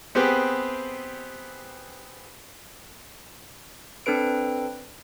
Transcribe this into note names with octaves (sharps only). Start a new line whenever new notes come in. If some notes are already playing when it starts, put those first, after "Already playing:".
B3 C4 G4 G#4 B4
C4 D4 A4 B4 D7